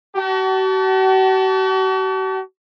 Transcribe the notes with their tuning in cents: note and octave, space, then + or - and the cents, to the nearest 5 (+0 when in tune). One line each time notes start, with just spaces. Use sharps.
F#4 +45 A5 +0